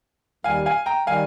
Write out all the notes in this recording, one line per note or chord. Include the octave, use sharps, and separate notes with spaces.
D#2 D#3 G3 F5 G#5
F5 G#5
G5 A#5
D#3 G3 F5 G#5